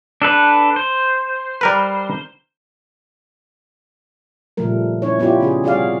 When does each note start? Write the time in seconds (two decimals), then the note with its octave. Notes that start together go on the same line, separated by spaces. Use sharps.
0.22 D4 A4 B4
0.76 C5
1.61 G3 A#4 B4
4.57 A#2 C#3 F3 G3 A3 A#4
5.02 C#4 E4 C#5
5.19 B3 E4 F4 G4 D5
5.41 C#3 C#4 G#4
5.63 C3 G3 F#4 G#4 D5 F5